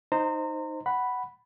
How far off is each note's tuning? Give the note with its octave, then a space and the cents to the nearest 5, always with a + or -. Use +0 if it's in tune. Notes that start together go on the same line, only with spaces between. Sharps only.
D#4 +0 C5 +0 A#5 -30
F#5 +10 B5 +0